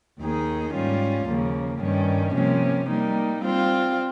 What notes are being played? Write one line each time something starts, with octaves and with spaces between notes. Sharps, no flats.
D#2 D#3 A#3 D#4 G#4
G#2 G3 C#4 F4
D#2 C#3 F3 A#3
G2 D#3 G3 C#4
C3 F3 A#3 C#4
G3 A#3 D#4
G3 C4 F4 C5